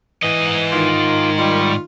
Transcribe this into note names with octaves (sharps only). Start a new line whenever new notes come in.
G#2 E3 D#5
D#3 F4 D6
G3 F4 C#6